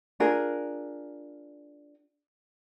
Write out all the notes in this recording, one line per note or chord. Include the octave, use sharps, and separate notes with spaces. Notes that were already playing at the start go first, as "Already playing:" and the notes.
D4 F4 G#4 A#4